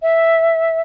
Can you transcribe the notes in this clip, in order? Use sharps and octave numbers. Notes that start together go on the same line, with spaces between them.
E5